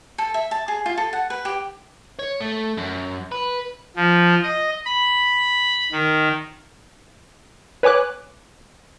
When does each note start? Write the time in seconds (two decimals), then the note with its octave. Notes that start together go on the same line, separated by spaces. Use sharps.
0.18 A4
0.34 E5
0.51 A5
0.68 G#4
0.86 F4
0.98 A4
1.13 F#5
1.30 B4
1.45 G4
2.19 C#5
2.41 A3
2.77 F#2
3.32 B4
3.96 F3
4.43 D#5
4.85 B5
5.92 D#3
7.83 B4 C#5 G#5 D6 F#6